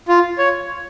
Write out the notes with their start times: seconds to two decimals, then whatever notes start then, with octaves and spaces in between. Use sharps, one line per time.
0.08 F4
0.38 C#5